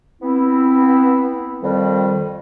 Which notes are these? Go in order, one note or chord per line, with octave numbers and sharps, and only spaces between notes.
B3 C4 E4
F2 D#3 G3